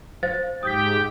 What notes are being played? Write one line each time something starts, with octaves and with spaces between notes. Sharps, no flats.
C5 F5 A6
G#2 G4 G5 D#6 G6 B6